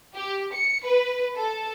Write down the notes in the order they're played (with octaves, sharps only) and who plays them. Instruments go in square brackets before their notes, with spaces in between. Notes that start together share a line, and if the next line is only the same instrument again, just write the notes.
[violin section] G4
C#7
B4
A4